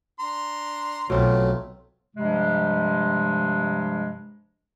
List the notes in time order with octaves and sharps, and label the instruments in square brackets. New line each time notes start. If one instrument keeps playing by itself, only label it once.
[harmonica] D4 A#5 C6
[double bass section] B1 [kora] B2 C4 F4 [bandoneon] F#3 A3
[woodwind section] G2 C3 F3 G3 G#3